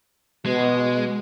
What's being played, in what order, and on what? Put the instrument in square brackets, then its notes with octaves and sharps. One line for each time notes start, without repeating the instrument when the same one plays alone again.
[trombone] B2 [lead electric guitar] G#3